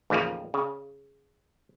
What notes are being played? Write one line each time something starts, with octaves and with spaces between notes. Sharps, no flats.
A1 D#2 C#3 F3 A#3
C#3